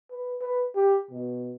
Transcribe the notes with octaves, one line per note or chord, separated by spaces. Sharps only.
B4
B4
G4
B2